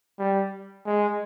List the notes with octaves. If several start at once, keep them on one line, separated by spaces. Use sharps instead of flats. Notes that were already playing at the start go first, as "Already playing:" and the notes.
G3
G#3